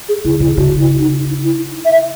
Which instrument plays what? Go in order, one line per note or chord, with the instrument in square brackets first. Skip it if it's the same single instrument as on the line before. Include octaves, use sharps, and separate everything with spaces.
[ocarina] G#4
[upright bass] C#3 [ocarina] E4
[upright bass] B2 [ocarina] E4
[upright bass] C#3 [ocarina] F#4
[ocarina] E4
D#4
E4
E5